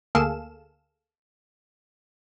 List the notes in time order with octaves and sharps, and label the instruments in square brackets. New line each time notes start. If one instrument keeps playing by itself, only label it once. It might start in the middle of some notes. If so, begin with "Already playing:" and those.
[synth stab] D2 A#3 G#4 A4 F5 E7